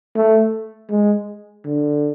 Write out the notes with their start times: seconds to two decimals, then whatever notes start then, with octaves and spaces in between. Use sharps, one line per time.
0.15 A3
0.90 G#3
1.65 D3